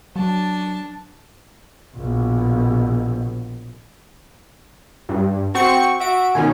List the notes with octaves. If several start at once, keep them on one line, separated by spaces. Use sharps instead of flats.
F#3 D4 A5
A#1 B2
G2
C4 F#4 C#6 C#7
F#4 E5 D7
B2 D#3 C#4 G#5